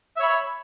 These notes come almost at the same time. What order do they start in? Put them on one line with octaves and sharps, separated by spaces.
E5 C#5 B5